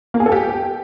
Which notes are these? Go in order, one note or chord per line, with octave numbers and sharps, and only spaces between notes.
A#3
G#4
A4
G4